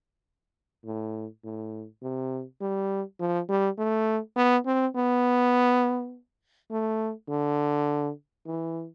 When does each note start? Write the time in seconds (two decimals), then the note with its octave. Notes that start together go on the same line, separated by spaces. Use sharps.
0.85 A2
1.44 A2
2.02 C3
2.61 G3
3.20 F3
3.49 G3
3.78 A3
4.36 B3
4.66 C4
4.95 B3
6.71 A3
7.29 D3
8.46 E3